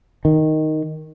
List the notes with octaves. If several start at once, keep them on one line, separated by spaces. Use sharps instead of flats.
D#3